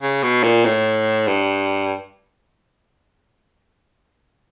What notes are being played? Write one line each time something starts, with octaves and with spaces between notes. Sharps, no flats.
C#3
B2
A#2
A2
G2